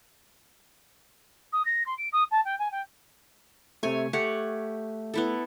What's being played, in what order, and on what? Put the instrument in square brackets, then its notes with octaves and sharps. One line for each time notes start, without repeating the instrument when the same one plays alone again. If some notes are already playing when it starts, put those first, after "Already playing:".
[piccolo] D#6
A#6
C6
D7
D#6
A5
G5
G#5
G5
[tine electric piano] C3 A3 [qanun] C#5 G#5
[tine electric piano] A3 [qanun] G4 C#5 F#5
[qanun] B3 E4 A4